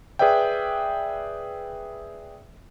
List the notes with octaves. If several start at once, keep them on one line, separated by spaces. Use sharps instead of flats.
G#4 B4 D5 E5 G5